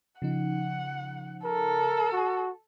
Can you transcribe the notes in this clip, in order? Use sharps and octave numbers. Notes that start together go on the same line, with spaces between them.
C#3 F3 D#4 F#5
A4 A#4
F#4